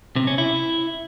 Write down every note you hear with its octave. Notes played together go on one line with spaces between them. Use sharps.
C3
C#4
E4